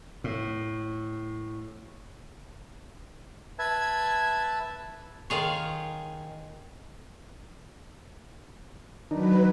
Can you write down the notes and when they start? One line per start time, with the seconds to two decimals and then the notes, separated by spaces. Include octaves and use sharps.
0.24 A2
3.59 B4 E5 A5 G#6
5.30 D#3 F4 G#4 C#5
9.11 D#3 F#3 D4 D#4 B4